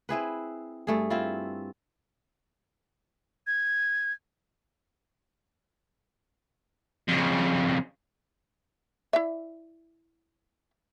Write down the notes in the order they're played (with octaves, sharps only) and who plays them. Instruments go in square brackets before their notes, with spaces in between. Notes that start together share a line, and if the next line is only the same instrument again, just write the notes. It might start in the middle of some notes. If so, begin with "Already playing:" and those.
[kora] C4 E4 G#4 B4
G2 A3 G#4
C4 E4 F4
[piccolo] G#6
[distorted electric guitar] F2 C#3
[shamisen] E4 D5 E5